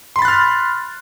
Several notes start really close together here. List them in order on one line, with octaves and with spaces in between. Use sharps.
C6 B5 A6 F#6 F6